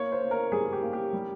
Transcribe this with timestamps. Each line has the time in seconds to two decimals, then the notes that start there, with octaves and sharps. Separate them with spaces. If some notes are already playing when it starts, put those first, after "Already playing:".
Already playing: A#3 C#5
0.12 C5
0.22 A#3
0.31 A#4
0.52 G3 G#4
0.73 G4
0.82 A#3
0.93 G4
1.13 G3